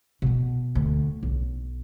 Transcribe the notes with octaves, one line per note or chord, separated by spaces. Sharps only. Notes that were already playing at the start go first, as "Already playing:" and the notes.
B2 B3
D2
B1